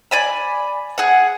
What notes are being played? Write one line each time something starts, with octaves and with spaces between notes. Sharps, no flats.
D5 G#5 B5
G#4 F#5